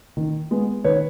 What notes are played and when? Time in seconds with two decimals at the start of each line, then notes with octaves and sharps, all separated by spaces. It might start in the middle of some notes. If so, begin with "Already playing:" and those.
0.17 D#3
0.51 G#3 B3
0.84 D#3 B4 C#5